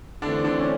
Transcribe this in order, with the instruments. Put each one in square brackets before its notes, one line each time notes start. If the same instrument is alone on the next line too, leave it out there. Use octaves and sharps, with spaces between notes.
[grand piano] D3 D4 [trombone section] E3 A3 C4
[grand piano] D3 D4
C#4